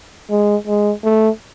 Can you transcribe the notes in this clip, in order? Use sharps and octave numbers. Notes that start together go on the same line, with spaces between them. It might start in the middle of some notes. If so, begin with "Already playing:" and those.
G#3
G#3
A3